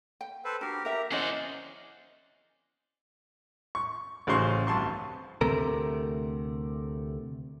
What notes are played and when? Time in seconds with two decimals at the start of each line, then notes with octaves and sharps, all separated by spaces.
0.21 G5
0.45 A4 B4 C5
0.61 D4 F#4 G4 A#4
0.85 G4 A#4 E5 A#5
1.12 C#4 E4 G#4 C5 D5 D#5 F#5
3.75 C#6
4.27 A1 C#3 F#4 C5 C6 C#6
4.67 C2 G2 A5 C6 C#6
5.41 D2 C3 A3 A#4